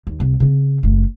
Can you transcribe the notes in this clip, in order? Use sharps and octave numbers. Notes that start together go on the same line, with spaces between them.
D#2
C2
C#3 C4
F#1 A3